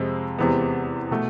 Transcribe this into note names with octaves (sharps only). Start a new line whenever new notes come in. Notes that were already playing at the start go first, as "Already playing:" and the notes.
Already playing: F2 C3 G#3
E2 C3 G#3 B3
B2 A3